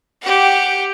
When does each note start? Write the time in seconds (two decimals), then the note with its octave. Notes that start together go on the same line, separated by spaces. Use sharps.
0.22 G4 F#5